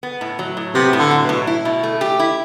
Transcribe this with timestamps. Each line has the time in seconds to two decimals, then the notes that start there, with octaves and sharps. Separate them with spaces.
0.03 B3
0.21 A2
0.39 F#3
0.57 A2
0.74 C3 B3
0.93 A2
0.99 D3
1.11 F#3
1.23 B2
1.29 A2
1.47 E4
1.65 B2
1.83 A3
2.01 G4
2.19 E4